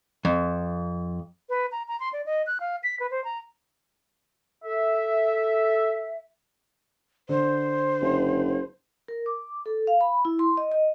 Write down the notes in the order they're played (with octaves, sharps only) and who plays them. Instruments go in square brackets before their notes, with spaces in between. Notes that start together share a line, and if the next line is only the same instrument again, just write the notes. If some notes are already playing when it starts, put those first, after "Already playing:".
[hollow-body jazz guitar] F2
[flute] B4
A#5
A#5
C6
D5
D#5
F#6
F5
B6
B4
C5
A#5
[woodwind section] A4 E5
[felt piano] D3 [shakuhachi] C5
[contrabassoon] F#1
[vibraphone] A#4
D6
A4
F5
B5
E4
C6
D#5
D#5